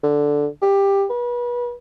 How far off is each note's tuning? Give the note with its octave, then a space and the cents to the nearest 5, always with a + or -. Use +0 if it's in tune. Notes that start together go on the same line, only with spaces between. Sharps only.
D3 -5
G4 +15
B4 -30